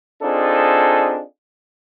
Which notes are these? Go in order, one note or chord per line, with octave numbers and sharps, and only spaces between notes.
C4 D4 D#4 F4 G#4 A4